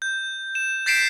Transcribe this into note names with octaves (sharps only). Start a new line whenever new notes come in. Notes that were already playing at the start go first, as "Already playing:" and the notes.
G6
E7
G6 A6 B6 C7 D7 E7